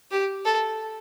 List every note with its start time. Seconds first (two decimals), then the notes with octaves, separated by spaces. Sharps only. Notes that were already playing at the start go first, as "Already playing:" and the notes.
0.11 G4
0.45 A4